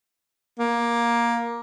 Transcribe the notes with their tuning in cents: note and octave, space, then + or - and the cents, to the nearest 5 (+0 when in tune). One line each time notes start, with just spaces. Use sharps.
A#3 +15